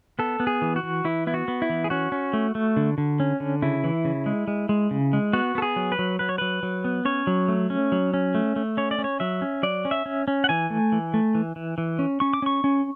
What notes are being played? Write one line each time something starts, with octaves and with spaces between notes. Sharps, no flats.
B3 A4
B3
G#4
E3
F#4
E3
E3 E4
B3 E4
F#4
B3
E4
E3
G#4
C#4 F#4
C#4
A3
A3
D3
D3
C#4
D3
C#3 E4
E3
C#3
G#3
G#3
G#3
C#3
G#3
B3 F#4
B3 A4
G#4
F#3
B4
F#3
F#3 B4
C#5
F#3 B4
F#3
B3
C#4 C#5
F#3
A3
C#4
F#3
C#4
A3
A3
C#4 C#5
D5
C#4
C#5
F#3 E5
C#4
F#3 D5
C#4
E5
C#4
C#4
F#5
E3 G#5
A3
E3
A3
E3
E3
E3
C#4
C#4 C#6
D6
C#4 C#6
C#4